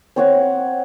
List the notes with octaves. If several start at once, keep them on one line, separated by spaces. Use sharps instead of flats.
C4 C#5 F#5